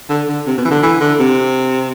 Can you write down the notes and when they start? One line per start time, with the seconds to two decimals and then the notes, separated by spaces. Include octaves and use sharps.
0.09 D3
0.28 D3
0.47 C3
0.58 B2
0.65 E3
0.71 D3
0.83 E3
1.00 D3
1.20 C3